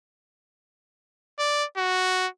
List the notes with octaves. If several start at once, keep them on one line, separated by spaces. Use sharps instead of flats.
D5
F#4